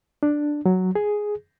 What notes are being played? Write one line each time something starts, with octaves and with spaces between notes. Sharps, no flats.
D4
F#3
G#4